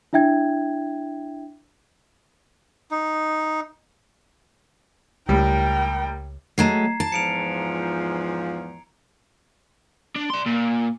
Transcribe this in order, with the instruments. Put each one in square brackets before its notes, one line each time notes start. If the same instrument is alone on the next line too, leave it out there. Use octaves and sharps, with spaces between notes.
[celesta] D4 E4 E5 G5 G#6
[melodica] D#4
[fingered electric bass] C#2 [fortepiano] A2 G3 [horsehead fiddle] A#4 G5
[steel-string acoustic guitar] F#3 G#3 A3 [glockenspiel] A#5 G#6 C7
[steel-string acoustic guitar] A5
[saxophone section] E2 G#2 F3 [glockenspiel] C#7 D7 F7
[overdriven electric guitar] D4
D5 C6
A#2